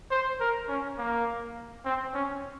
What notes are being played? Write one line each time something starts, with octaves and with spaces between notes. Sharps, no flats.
C5
A#4
C#4
A#3
C4
C#4